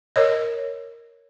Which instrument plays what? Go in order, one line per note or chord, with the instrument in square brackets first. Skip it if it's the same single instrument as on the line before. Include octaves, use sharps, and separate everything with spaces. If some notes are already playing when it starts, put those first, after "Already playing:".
[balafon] A#4 C#5 D#5